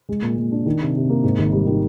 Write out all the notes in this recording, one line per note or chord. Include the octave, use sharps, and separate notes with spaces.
G#3
A#2
A#2
D4
D#3
C3
C3
A#3
G#2
G#1
G3
D#3